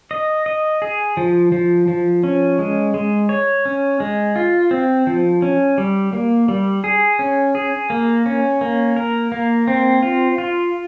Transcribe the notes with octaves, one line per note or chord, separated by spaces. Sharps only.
D#5
D#5
G#4
F3
F3
F3
C#4
G#3
G#3
C#5
C#4
G#3
F4
C4
F3
C#4
G3
A#3
G3
G#4
C#4
G#4
A#3
C#4
A#3
A#4
A#3
C4
F4
F4